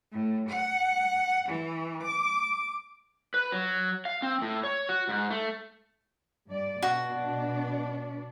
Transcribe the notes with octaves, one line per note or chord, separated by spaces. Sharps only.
A2
F#5
E3
D6
B4
F#3
F5
C4
A2
C#5
F#4
G#2
A3
G2 D5
B2 D4 F#4